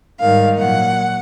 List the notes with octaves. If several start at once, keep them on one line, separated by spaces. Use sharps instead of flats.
G#2 D#3 G3 F5
A#2 F#3 F#5